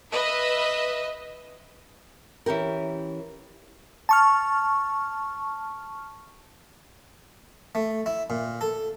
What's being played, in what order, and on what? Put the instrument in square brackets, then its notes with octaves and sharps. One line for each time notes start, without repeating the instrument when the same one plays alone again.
[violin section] B4 D#5 E5
[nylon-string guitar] E3 C#4 G4 A#4
[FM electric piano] A5 C#6 F6
[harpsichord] A3
E4
A#2
A4